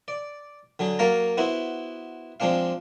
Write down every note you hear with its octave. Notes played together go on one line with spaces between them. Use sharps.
D5
D3 F#3 G#4
F#3 A#3 C#5 F5 A5 A#5
B3 E4 F#4 C5
F3 G#3 C4 D4 F5